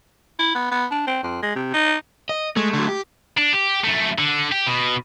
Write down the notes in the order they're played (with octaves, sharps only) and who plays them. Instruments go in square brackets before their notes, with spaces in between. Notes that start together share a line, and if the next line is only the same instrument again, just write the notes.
[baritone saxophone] E4
B3
B3
D4
C4
F2
G#3
C3
D#4
[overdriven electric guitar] D#5
[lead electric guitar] G#3 [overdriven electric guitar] A3
[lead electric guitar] D3 F#3
G4
[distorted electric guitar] D4
G4
F#2 A3
D3
G4
B2